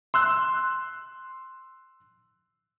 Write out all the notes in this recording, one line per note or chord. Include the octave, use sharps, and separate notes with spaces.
C6 E6 F#6